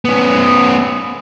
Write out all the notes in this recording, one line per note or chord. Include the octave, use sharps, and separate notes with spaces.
B3 C#4